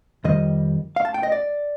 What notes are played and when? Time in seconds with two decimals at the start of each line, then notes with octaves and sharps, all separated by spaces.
0.24 F2 D#3 G3 D#5
0.96 F5
1.05 A5
1.14 G5
1.23 D#5
1.32 D5